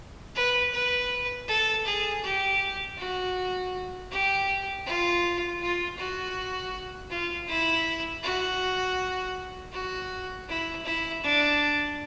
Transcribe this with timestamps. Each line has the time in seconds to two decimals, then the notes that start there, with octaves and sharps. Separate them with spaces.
0.35 B4
0.73 B4
1.48 A4
1.85 G#4
2.23 G4
2.98 F#4
4.11 G4
4.86 F4
5.61 F4
5.98 F#4
7.10 F4
7.48 E4
8.23 F#4
9.72 F#4
10.48 E4
10.85 E4
11.23 D4